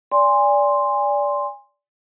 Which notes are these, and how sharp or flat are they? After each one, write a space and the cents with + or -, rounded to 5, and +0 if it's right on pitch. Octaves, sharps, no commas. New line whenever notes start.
D5 -20 G#5 -25 C6 +0